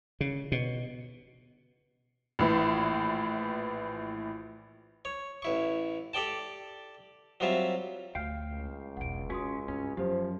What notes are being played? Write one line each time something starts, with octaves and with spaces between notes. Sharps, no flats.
C#3
B2
A#1 A2 E3
C#5
A1 E4 C#6
G4 A4 D5 G5 A5
F#3 G3 C4 F4 E5
D2 F5 G5 F6 G6
C#2
E1 B1 F#5 D7
F#2 C#4 F#4 C6 D#6
G2 C#4
F#2 F3 B3 G4 C5